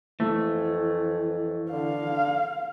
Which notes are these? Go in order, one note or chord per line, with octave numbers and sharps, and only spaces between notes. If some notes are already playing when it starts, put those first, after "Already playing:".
F2 E3 A3
D3 F5